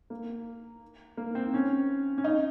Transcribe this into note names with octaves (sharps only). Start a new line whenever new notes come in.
A#3
A#3
C4
C#4
C#4
D#4